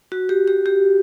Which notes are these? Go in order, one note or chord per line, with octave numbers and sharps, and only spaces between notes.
F#4
G4
G4
G4